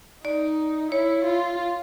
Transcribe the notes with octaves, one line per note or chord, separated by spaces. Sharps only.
D#4 D5
E4 C#5
F4